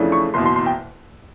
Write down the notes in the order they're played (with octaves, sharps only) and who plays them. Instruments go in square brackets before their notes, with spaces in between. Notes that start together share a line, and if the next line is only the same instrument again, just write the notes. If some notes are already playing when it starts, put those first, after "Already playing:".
Already playing: [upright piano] F2 C#3 E3 A3 D4
C#6
F#1 E2 B2 C6
C6
C6
G5